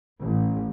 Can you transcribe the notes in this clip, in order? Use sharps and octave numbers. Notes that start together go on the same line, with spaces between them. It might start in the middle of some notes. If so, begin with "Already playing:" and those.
A1